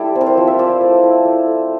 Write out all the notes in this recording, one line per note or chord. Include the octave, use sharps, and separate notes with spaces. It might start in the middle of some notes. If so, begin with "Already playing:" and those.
Already playing: G3 A3 E4 D5 E5 A5
C4
A#4
C5
F3
E5
E4 D5
A3
E4
A3
A3